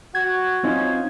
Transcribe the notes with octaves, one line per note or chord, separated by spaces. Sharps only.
F#4 G#6
F#3 C4 C#4 D#4 F4